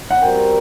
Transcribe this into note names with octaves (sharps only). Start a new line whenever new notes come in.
F#5
G3 C4 F#4 A#4 G5